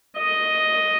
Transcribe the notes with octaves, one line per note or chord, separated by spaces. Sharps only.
D#5